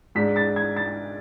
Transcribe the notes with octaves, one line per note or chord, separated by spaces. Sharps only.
G#2 G#3 D4 B6
A6
G#6
A6